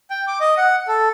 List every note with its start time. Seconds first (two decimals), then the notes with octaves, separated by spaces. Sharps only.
0.10 G5
0.27 D6
0.40 D#5
0.57 F#5
0.88 A4